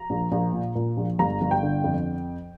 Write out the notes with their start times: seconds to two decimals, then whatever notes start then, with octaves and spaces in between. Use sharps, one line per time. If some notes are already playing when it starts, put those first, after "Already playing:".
Already playing: A#5
0.10 A#1
0.32 A#1
0.53 A#2
0.76 A#2
0.97 A#1
1.19 G1 A#5
1.41 G1
1.51 G5
1.63 D3
1.84 F2